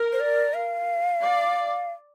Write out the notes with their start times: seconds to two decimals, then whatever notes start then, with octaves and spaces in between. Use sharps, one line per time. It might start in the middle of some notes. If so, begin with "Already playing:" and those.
Already playing: A#4
0.12 C5
0.20 D5
0.54 F5
1.22 D5